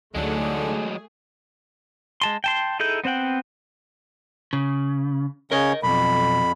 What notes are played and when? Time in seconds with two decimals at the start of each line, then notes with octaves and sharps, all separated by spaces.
0.15 D2 D3 F#3 G#3 A3 D#4 G#4
2.21 G#3 A5 C6
2.44 G5 A5 C6
2.80 D#4 E4 G#4 A4 G6
3.04 B3 C4 C5 F#5 G5
4.53 C#3
5.52 C#3 C#4 A#4 C#5 D#5
5.83 B1 F2 B5